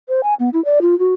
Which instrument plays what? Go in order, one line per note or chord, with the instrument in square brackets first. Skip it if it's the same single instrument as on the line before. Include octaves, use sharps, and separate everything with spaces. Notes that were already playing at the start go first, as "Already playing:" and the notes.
[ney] C5
G#5
B3
E4
D5
F4
F#4